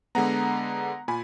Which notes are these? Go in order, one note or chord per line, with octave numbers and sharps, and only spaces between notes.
D3 G#3 B3 F#5 A#5
A#2 G#5 B5